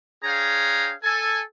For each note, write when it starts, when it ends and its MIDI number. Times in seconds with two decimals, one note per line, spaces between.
0.24 0.92 62
0.24 0.92 68
0.24 0.92 73
0.24 0.92 77
0.24 0.92 79
0.24 0.92 82
1.03 1.41 69
1.03 1.41 80